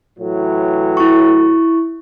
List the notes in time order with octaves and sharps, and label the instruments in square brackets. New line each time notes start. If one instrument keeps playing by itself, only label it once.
[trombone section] A2 E3 F#3
[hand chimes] E4 C#6